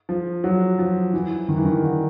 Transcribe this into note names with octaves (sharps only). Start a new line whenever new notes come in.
F3
F#3
F3
E3
D#3
E3
D#3
D3